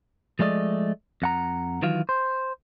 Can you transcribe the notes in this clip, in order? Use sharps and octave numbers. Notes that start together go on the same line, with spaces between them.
F3 G#3 A3 D5 D#5
F2 F#5 A#5
D#3 E3 F#3 F4
C5